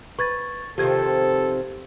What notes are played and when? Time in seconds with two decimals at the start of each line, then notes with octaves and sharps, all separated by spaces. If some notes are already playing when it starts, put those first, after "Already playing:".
0.19 B4 C#6 G#6 A6
0.78 C3 D#3 F3 G4 A4 G#6